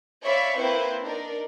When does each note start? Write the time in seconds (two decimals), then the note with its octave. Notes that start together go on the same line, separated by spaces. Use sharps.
0.23 C#5 D5 E5 F5 B5 C#6
0.57 A#3 C4 E4 B4 C5
1.03 D4 D#4 A#4 D5